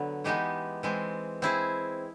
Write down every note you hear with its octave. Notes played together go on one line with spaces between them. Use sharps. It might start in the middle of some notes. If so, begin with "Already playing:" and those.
Already playing: D3 F#3 B3
E3 G#3 B3 D#4 G4
E3 G#3 C4
C4 E4 G#4